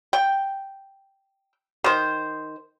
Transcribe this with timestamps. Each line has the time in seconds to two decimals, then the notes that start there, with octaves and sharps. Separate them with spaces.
0.13 G5
1.84 D#3 C5